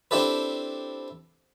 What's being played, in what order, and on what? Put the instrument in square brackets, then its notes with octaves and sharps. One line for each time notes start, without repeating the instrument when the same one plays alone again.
[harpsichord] C4 D4 E4 G4 A4 B4